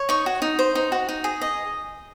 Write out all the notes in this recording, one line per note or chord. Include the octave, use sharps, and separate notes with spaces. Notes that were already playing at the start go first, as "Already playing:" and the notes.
Already playing: C#5
D#4 C#6
F#4
D#4
C5
D#4
F#4
D#4
G#4
D#5